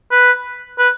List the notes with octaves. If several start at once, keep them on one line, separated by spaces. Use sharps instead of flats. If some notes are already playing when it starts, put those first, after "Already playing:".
B4
B4